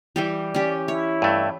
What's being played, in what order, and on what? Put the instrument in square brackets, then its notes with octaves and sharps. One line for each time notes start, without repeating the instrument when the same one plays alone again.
[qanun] E3 G3 G4
[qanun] C#4 G4 [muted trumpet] D5
[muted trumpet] E4 [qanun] C#5
[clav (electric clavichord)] G2 A3